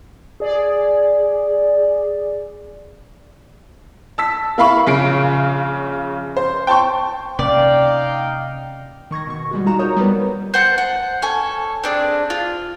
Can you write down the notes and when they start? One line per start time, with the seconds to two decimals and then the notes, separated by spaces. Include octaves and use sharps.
0.40 G#4 D5
4.18 A5 E6 B6
4.58 A#3 E4 F5 B5 C#6
4.87 A#1 C#3 F4 C7 D7
6.37 C5
6.67 G5 A5 C6 C#6
7.39 C3 A#3 C#4 D#4 D5 F5 G5
9.11 D#3 C#6 G#6 A#6
9.27 B2 C#6
9.51 G3 G#3 F#4
9.66 D#4 F4 F#4 A#5 E7
9.79 A#4 C#5 A#5 D#6 G6
9.97 G3 B3 D#4 B4
10.54 C5 F#5 A5
10.78 F#5
11.22 C#4 A4 G#5
11.83 C4 D4 G#4
12.30 F4